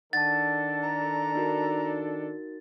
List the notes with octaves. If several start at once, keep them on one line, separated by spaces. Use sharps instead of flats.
D#3 D4 A4 F#5 A5 A6
A#5
D#4 F#4 A#4